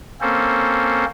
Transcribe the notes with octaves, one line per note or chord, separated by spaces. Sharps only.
A#3 C4 C#4 A4 C5